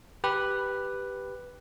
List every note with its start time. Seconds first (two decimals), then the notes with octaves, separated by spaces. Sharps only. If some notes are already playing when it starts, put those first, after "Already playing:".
0.24 G4 B4